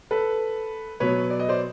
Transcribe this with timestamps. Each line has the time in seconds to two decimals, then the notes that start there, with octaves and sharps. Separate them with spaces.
0.11 A4 B4
1.00 B2 F#3 B3 B4 C#5
1.30 D5
1.39 D#5
1.49 C5 D5